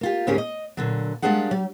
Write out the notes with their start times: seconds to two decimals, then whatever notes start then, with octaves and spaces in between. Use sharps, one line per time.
0.01 A#3 F4 G4
0.27 D2 G#2 A#3 C#4 G4 G#4
0.38 D#5
0.77 A#2 D3 F#3
1.22 G3 G#3 A#3 D4 G#4 F#5
1.51 F#3